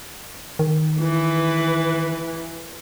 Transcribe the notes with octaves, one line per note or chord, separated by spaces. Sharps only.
D#3
E3 B4